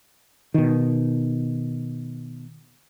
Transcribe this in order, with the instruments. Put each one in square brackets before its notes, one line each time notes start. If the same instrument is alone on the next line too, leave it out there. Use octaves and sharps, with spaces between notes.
[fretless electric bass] B2 D#3